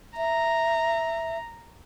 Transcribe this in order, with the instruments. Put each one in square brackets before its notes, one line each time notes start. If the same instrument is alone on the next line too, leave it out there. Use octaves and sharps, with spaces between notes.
[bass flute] E5 [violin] A#5